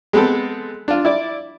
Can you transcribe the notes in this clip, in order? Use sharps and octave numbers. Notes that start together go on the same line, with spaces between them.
G#3 B3 C4 A4
D4 F4
E4 D5